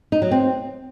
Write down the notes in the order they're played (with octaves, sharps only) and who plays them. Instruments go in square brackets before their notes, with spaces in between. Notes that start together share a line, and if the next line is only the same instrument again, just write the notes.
[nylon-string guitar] D#4
F#3
C4